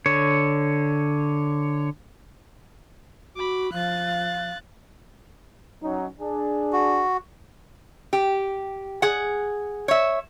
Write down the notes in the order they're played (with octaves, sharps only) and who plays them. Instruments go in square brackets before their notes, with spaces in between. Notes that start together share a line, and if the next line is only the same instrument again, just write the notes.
[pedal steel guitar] D3 C#5
[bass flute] F#4 [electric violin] B5 D6
[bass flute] F3 [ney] F5 [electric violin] F#6 A6
[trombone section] F#3 C#4 D#4
D4 G#4
[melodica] F#4
[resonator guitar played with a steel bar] G4
G#4 F#5
C#5 E5